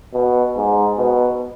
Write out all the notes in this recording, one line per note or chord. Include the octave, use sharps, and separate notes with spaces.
B2
G#2
B2